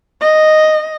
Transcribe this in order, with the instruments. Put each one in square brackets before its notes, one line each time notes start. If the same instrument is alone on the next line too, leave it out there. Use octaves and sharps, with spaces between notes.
[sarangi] D#5